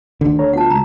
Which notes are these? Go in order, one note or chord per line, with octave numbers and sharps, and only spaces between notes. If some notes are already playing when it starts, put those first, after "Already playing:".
D2 D3 D#3 F#4
A4 C#5 A#5
B3 F4 F#4 F#5 A5
C#3 G#3 A#5